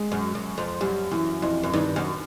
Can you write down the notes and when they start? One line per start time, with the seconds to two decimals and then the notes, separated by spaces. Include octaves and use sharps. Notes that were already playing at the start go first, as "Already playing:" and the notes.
Already playing: G#3
0.12 F#2
0.35 F#2
0.58 F2
0.81 F#2 G3
1.12 F#2 E3
1.42 F2 E3
1.63 F#2
1.74 G2 D#3
1.96 F#2